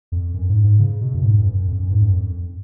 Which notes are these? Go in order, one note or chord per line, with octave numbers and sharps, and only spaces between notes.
F2
F#2
G#2
G#2
C#3
B2
F#2
G#2
F#2
F#2
F2
F#2
G#2
F#2
F2